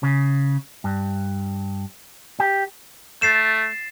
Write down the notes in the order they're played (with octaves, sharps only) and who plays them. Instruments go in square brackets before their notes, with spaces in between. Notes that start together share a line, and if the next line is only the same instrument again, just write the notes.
[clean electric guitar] C#3
G2
G4
[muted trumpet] A3 [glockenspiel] A6 C7 E7